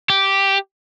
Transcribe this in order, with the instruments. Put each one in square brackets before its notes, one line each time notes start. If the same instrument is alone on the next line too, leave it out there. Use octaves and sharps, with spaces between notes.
[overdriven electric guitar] G4